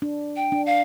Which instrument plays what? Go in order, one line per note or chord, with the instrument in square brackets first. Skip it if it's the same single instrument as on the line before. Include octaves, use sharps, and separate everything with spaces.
[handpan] D4
[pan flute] G5
[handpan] D4
[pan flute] F5